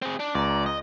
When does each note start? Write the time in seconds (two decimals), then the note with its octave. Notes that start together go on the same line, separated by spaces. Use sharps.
0.02 C4 G#4
0.20 D4
0.35 C#2 D5 A#5
0.66 D#5